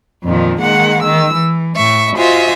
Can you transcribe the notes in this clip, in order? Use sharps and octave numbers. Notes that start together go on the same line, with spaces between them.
F2 A#2 D#3 F3
D#3 G#3 A#3 F#5
D#3 E6
E3
A2 E5 C#6
F4 F#4 C5 D#5 E5 G#5